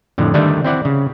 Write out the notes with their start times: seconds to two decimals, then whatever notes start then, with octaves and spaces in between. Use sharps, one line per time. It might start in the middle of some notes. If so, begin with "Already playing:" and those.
0.18 F2 A2 D3
0.34 D3 D#3 G3 A3 D4
0.64 C4 E4 D5 F#5
0.85 C#3